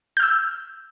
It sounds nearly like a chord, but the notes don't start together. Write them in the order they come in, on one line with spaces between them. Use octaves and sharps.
G6 F6 E6